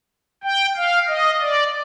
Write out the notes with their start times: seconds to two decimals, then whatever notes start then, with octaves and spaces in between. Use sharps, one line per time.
0.43 G5
0.76 F5
1.08 D#5
1.41 D5